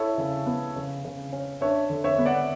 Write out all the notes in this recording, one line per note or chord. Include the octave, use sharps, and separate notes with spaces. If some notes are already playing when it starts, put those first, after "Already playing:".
Already playing: E4 A4 C#5
C#3
B3
C#3
C#3
C#4
D4 C#5 E5
D3
C#5 E5
B3
D5 F#5